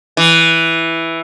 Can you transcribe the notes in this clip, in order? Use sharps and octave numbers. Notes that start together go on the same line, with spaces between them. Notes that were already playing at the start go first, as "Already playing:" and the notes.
E3